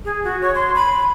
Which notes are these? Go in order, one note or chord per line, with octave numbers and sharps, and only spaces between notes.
G#4
F#4
C#5
C6
B5